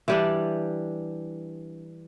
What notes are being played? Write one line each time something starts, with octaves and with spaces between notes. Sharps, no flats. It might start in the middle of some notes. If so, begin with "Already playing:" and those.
E3 G3 D4